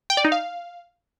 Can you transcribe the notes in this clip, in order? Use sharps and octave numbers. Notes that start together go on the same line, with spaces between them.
G5
D5
D#4
F5